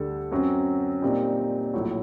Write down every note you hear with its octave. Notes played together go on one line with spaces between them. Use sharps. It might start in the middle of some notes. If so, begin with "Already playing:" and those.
Already playing: D2 D3 G3 D4 A4
F#2 F#3 C4
A#2 G3 C4 D#4
A#1 A2 F#3